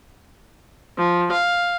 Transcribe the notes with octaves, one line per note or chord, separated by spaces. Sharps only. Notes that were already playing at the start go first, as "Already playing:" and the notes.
F3
F5